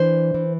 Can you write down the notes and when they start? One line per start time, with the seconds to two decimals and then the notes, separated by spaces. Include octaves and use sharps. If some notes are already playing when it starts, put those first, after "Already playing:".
Already playing: E3 D4 C5
0.34 E3